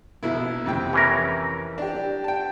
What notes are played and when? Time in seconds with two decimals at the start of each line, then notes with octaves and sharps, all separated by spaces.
0.23 A#1 B2 E4
0.66 F2 C3 G5
0.93 E3 C#4 A#4
1.78 D4 G4
2.24 G5 A5